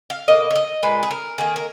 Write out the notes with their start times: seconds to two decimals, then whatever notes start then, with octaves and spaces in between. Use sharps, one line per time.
0.10 F5
0.28 B2 A#3 D#5
0.51 C#5
0.56 D#5
0.83 A#2 G#3 B4
1.03 G#4
1.11 A#4
1.38 D#3 A#3 G#4
1.56 A#4